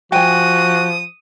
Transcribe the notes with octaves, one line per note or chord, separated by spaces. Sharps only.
F3 F#4 G5 G#5 D#6